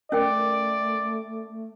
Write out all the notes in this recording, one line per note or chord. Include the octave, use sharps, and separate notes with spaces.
A3 C#4 A#4 D5 G5